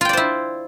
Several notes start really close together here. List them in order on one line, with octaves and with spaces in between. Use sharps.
F4 G5 D5 C5 E4